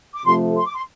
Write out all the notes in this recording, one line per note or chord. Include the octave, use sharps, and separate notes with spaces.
D6
C3 F3 A3 C6
C6
D6
C6